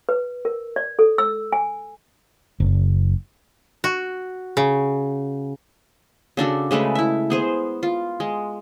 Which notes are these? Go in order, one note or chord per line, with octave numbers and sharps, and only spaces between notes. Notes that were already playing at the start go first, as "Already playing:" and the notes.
B4
A#4
D5
A4
E6
G#5
F#1
F#4
C#3
C#3 D4 F#4 A4
C#3 G#3 A3 B4
E4 E5
B3 G#4 C5
F4
G#3